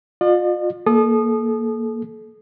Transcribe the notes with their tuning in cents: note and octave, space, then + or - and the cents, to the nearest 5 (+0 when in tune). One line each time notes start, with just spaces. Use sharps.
F4 +30 D#5 -45
A#3 +0 A4 -35 D#6 -25